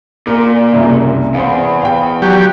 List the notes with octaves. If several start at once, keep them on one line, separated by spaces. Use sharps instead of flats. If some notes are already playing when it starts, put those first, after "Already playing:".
A#2 A#4
F#1 C2 G#3
E2 C5 F5
F5 G5
F#3 G4